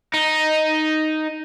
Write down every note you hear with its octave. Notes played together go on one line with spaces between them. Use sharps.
D#4